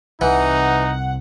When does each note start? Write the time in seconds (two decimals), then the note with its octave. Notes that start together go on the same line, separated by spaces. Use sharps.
0.21 C2 C3 E3 D#4 F#5